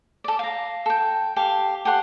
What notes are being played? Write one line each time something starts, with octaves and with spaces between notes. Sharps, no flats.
A4 D5
F5 A#5
A4 G5
G4 A4 F5
G4 A4 F#5 C6